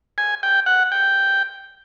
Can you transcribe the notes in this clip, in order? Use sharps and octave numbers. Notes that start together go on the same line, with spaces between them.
G#5
G5
F#5
G5